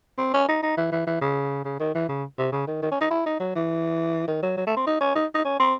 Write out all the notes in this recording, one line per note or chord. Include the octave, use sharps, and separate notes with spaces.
C4
C#4
D#4
D#4
E3
E3
E3
C#3
C#3
D#3
E3
C#3
C3
C#3
D#3
D#3
C#4
D#4
E4
D#4
F#3
E3
D#3
F#3
F#3
A3
C4
D#4
C#4
D#4
D#4
C#4
C4